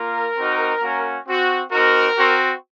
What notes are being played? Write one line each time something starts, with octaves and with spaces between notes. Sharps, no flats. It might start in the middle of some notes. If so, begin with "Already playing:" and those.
Already playing: A#3 F4 A#4
C4 D#4 F#4
A#3 C#4 F#4
C4 F#4
C4 D#4 F#4 A#4
C4 F#4